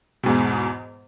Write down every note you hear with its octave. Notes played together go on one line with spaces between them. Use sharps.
E2 G#2 B2